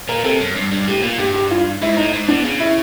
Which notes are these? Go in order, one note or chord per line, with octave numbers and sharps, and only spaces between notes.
A#2 A#4
C3 A4
F#2
G2
G2
A2 G4
A#2
G2 G4
G4
F4
G#2 E4
A2 D#4
G#2
B2 D4
C#3
E4